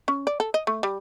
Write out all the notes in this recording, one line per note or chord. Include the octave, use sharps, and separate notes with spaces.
C#4
D5
A4
D#5
A3
G3